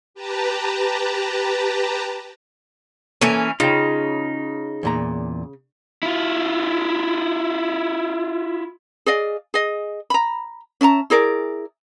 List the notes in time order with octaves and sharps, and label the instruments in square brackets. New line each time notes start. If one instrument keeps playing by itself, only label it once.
[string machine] G4 B4 A5 A#5
[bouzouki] E3 C#4 [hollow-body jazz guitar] A#3 A4 C#5
[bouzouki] C#3 [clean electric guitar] D#4 [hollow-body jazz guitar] F4 G5
[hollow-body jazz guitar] E2 A#2 A#5
[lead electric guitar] E4 F4
[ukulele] G#4 D5 D#5 F5
G#4 D#5
A#5 B5
C#4 E5 A5 A#5
E4 G#4 A#4 D5